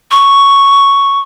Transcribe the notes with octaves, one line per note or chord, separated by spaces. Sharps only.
C#6